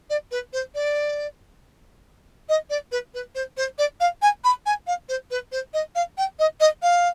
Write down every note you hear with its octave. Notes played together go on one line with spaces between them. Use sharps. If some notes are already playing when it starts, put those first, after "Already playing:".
D5
B4
C5
D5
D#5
D5
B4
B4
C5
C5
D5
F5
G#5
B5
G#5
F5
C5
B4
C5
D#5
F5
G5
D#5
D#5
F5